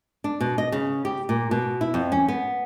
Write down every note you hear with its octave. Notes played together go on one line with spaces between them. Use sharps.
D4
B2
D#5
C#3
G4
A#2
B2
E4
F2
C#4
B3